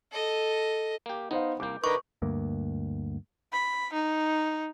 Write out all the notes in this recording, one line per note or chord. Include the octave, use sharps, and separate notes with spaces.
A4 D#5
A#3 G4
B3 D#4 C5 F5
C2 A#3 D6 G6
D3 D#4 A#4 B4 C#6 D6
D2 G2 A#3
B5
D#4